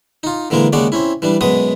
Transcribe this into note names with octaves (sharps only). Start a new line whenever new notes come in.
D#4 F4
D3 E3 G#3 A#3 A#4
D#2 C#3 G#3 F#4 D5
C4 C#4 E4
E3 G3 D4
F#2 B2 G#3 B4 D#6